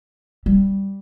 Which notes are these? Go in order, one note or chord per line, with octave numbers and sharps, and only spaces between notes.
G3